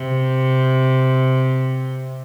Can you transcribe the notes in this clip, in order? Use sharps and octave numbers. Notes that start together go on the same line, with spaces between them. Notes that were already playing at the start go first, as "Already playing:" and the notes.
Already playing: C3